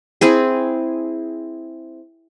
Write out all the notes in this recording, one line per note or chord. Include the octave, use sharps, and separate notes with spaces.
C4 E4 G#4